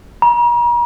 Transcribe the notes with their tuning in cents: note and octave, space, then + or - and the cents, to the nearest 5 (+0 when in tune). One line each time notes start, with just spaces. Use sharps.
A#5 +40